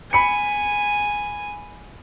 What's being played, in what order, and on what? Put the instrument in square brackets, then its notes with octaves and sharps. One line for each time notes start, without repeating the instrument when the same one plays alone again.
[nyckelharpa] G#5 [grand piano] B5 C#7